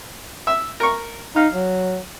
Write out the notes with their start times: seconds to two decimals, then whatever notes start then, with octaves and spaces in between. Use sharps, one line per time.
0.47 E5
0.80 A#4 C#6
1.36 D#4 F5
1.53 F#3